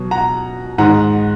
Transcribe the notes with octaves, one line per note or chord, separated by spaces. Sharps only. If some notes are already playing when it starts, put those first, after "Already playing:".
Already playing: B2 F#3
F#5 A#5
G#2 D#3 G#3 F#5 A#5